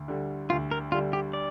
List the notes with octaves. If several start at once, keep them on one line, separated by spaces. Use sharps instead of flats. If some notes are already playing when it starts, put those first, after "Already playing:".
Already playing: D2
D3 G3
D2 F4
A#4
D3 G3 F4
G4
D5